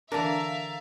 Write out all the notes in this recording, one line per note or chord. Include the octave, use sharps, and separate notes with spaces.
D3 E3 D4 A#4 E5 F5 A5 A#5